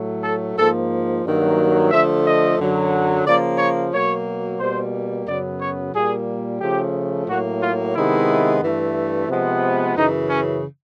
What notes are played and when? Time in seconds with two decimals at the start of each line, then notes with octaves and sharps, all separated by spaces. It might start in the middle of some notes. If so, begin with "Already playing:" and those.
Already playing: A2 F#3 A3
0.24 A4
0.57 G#2 F3 A#3 A4
1.24 G2 D#3 F#3 A#3
1.91 D3 F3 A3 E5
2.25 D#5
2.59 F#2 D3 F#3
3.25 C#3 F3 A#3 D5
3.58 C#5
3.92 B2 F#3 A#3 C#5
4.59 B2 G3 A#3 C5
5.27 F#2 C#3 F#3 B3 D5
5.60 C#5
5.94 A#2 G3 A#3 G#4
6.60 C#3 F3 A3 G4
7.28 A2 F#3 A#3 F#4
7.61 F4
7.95 C3 D#3 G#3 B3 E4
8.61 G2 E3 A3
9.28 C3 F3 G#3 B3
9.96 F#2 C#3 E3 D#4
10.29 C#4